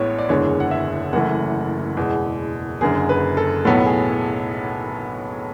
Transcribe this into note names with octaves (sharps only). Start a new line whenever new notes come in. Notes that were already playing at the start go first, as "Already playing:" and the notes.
Already playing: A1 A2 G#3 B3 C#5
D5
F#1 E2 D3 G#3 C#5
F#5
E5
F#1 F#2 E3 A3 F#5
E2 B2 G#3
F#1 F#2 D3 G#4
B4
A4
B1 A2 F#3 B3 A4
G#4